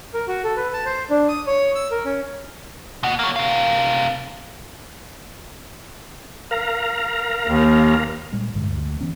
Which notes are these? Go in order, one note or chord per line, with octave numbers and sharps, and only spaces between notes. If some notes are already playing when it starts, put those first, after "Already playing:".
A#4
F#4
A4
B4
A5
C5
D4
D#6
C#5
E6
A#4
C#4
B2 F#5
F#3 A#3
C3 F5
A#4 F5 A#5
D#2
A#2 G3 G#3
A1 G2 D3 G#3
D2
E3 B3 C#4